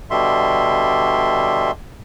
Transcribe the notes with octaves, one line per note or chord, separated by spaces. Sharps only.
B2 D3 G3 E5 C6